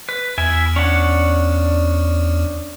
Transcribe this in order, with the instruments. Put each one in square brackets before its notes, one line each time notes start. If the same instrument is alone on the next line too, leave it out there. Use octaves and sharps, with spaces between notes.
[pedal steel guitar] B4
[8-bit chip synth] E2 [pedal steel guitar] E4 E5 G#5
[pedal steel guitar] C#4 D4 F#5